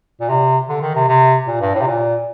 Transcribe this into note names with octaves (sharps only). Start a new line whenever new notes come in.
A#2
C3
D3
D#3
C3
C3
A#2
G2
A2
C3
A#2